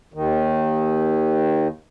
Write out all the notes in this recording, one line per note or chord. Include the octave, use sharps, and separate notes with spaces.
D#2 D#3